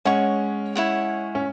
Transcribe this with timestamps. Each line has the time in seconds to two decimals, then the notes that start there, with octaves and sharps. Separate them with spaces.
0.05 G#3 C#4 C#5 F#5 C#6
0.75 E4 C#5 F#5
1.35 C#4